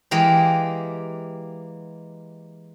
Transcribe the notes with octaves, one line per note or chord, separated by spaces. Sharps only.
E3 G#3 A#3 G4 A#4